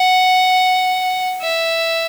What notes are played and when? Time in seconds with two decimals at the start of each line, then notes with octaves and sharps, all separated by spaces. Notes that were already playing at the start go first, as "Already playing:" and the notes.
Already playing: F#5
1.41 E5